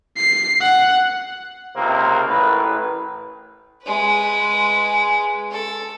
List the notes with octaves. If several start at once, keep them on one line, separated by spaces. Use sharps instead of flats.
C7
F#5
C#2 C3 A#3 C4
A1 A2 A#4 B4
G#3 B4
A4